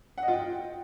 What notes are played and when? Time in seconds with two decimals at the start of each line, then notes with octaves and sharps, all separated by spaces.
0.18 F#5
0.23 D#5
0.28 F4
0.33 G5